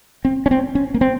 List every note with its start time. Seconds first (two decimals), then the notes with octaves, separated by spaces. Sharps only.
0.25 C4
0.46 C#4
0.51 C4
0.75 C#4
0.94 A#3
1.01 C4